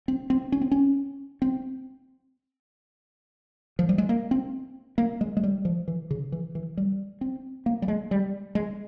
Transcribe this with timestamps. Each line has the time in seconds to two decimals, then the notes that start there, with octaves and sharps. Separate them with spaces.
0.08 C4
0.30 C4
0.52 C#4
0.61 C4
0.71 C#4
1.42 C4
3.79 F3
3.89 G3
3.98 G#3
4.09 A#3
4.31 C4
4.98 A#3
5.21 G#3
5.37 G#3
5.43 G3
5.65 F3
5.88 E3
6.11 C#3
6.32 E3
6.55 E3
6.77 G3
7.21 C4
7.66 A#3
7.82 G3
7.88 G#3
8.11 G3
8.55 G#3